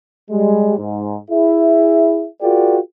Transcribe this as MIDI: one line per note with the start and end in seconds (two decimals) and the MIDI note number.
0.31 0.74 55
0.31 0.74 56
0.78 1.17 44
1.31 2.26 64
1.31 2.26 68
1.31 2.26 76
2.42 2.78 65
2.42 2.78 66
2.42 2.78 68
2.42 2.78 70
2.42 2.78 74
2.42 2.78 79